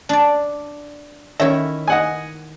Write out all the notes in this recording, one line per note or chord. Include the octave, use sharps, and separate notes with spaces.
D4 D5
D#3 C#4 E4 E5
D#5 F#5 G#5